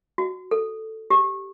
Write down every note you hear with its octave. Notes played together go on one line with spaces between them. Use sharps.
F#4
A4
G4